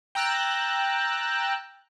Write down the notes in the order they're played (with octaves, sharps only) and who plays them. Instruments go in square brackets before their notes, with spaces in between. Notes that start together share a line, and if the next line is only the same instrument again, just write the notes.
[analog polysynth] G5 A#5 E6 F#6 A6